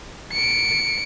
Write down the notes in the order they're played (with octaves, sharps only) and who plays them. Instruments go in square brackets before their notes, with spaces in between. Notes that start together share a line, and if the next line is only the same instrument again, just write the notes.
[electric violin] C#7 D7